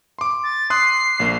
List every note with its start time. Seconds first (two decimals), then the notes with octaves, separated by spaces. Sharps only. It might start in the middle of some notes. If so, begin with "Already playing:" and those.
0.19 C6 D6
0.44 A6
0.70 C6 D#6 F#6 C7
1.20 A#1 A#3